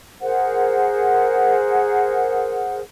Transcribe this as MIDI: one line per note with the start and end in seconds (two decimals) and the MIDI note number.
0.21 2.80 68
0.21 2.80 70
0.21 2.80 72
0.21 2.80 78